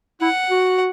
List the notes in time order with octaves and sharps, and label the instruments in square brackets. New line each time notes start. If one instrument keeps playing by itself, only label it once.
[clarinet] E4 [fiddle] F#5
[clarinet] F#4